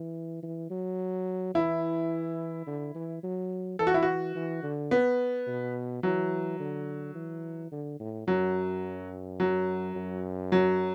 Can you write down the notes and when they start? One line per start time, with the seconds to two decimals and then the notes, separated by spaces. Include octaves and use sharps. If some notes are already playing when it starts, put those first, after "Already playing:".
Already playing: E3
0.43 E3
0.70 F#3
1.54 E3 E4
2.67 D3
2.95 E3
3.23 F#3
3.79 E3 A4
3.87 F#4
3.94 E4
4.03 F#4
4.35 E3
4.63 D3
4.91 B3
5.47 B2
6.03 E3 F#3
6.60 D3
7.15 E3
7.72 D3
8.00 A2
8.27 F#2 F#3
9.40 F#3
9.95 F#2
10.52 F#3